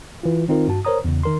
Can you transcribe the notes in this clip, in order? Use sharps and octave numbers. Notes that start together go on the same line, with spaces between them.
E3 F4
D#3 C4 D#4 F4 A#4
G2 F#4 A5
A#4 C5 C#5 A#5 D#6
E2 C#3
D#3 A#4 C6